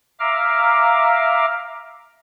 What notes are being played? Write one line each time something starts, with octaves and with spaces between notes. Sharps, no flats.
E5 F5 A#5 D6 F6